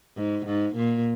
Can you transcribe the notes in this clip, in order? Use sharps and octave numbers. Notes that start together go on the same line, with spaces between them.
G#2
G#2
A#2